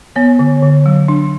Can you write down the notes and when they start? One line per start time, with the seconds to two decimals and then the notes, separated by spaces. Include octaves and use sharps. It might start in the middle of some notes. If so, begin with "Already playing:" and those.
0.16 B3 C#5
0.39 D3
0.62 D3
0.86 F#3
1.08 D4